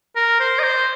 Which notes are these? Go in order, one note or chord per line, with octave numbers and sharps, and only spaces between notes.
A#4
C5
D#5
C5